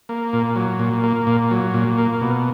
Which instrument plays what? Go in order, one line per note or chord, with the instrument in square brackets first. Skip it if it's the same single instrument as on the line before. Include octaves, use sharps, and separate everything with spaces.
[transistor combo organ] A#3
A#2
F#3
A#2
A#3
A#2
F#3
A#2
A#3
B2